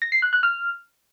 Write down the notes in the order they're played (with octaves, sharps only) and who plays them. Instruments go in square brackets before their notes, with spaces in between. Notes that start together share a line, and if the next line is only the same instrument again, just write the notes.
[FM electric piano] A#6
C7
F#6
F#6
F6